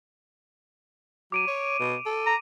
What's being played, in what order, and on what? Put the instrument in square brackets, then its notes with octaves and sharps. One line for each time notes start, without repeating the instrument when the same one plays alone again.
[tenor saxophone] F#3 [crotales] D6 D7 D#7
[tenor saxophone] C#5
B2
A4
[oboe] A#5